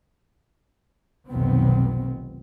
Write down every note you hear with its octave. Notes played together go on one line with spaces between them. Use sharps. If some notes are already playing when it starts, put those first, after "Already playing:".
F1 B1 F2 D#3 B3 C4